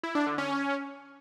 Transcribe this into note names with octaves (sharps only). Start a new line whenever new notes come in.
E4
D4
D3
C#4